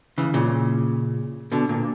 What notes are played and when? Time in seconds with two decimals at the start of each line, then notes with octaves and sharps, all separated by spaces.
0.18 C#3 E3
0.34 A#2 C#3
1.52 B2 D3
1.69 A#2